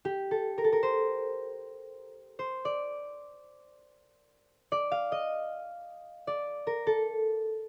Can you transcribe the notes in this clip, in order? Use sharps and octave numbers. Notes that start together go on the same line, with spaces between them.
G4
A4
A#4
A4
A#4
C5
C5
D5
D5
F5
D#5
D5
A#4
A4